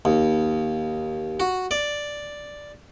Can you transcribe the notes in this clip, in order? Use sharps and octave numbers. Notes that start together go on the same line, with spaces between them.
D#2
F#4
D5